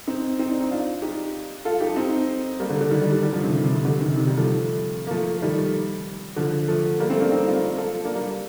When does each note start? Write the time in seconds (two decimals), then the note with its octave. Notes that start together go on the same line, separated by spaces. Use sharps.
0.07 C4 D#4
0.39 C4 D#4
0.50 D4
0.61 D#4
0.71 D4 F4
1.02 D#4 G4
1.65 F4 A4
1.80 D#4 G4
1.96 C4 D#4
2.60 G3 A#3
2.70 D3
2.81 D3
2.91 D#3 G3
3.01 D#3 G3
3.12 D#3 G3
3.22 D#3 G3
3.33 D3 F3
3.43 C3 D#3
3.54 D3
3.64 C3
3.75 C3
3.85 D3
4.01 C3 D#3
4.16 C3 D#3
4.27 D#3 G3
4.37 F3 A3
5.07 A#3
5.11 F3 A3
5.37 A3
5.42 D#3 G3
6.36 D3 F3
6.68 F3 A3
7.00 G3 A#3
7.10 A3 C4
7.20 A#3 D4
7.31 C4 D#4
7.47 D4 F4
7.78 F4 A4
8.05 A#3 D4
8.15 G3 A#3